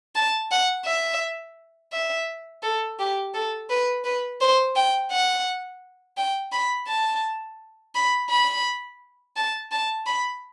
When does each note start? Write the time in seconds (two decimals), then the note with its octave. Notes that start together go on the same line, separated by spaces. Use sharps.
0.15 A5
0.51 F#5
0.86 E5
1.93 E5
2.63 A4
2.99 G4
3.34 A4
3.70 B4
4.04 B4
4.41 C5
4.76 G5
5.12 F#5
6.17 G5
6.52 B5
6.88 A5
7.95 B5
8.30 B5
9.36 A5
9.72 A5
10.06 B5